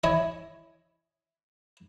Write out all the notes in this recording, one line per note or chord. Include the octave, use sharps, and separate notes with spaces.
E4 C#5 D#5 G#5